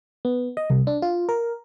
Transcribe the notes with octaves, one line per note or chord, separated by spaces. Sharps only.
B3
D#5
C2
D4
F4
A#4